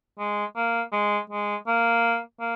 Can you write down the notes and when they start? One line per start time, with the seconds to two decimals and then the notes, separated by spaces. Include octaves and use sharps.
0.19 G#3
0.56 A#3
0.92 G#3
1.30 G#3
1.67 A#3
2.40 A#3